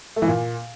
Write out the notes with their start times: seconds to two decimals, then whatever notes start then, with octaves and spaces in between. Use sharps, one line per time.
0.16 A3
0.22 E3
0.28 A#2